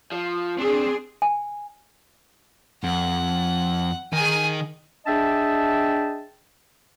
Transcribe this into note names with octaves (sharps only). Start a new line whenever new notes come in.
F3
C4 D4 G#4
G#5
F2 F#5
D#3 D#4 G#4 G#5
D4 G#4 D#5 E5 G5 A5